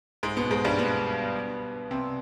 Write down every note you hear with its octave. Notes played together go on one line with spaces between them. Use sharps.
G#2 G#3
B2 B3
G#2 G#3
G2 G3
B2 B3
C3 C4